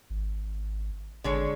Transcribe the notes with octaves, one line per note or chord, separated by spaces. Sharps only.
G#1
G#1 D3 G#3 C#5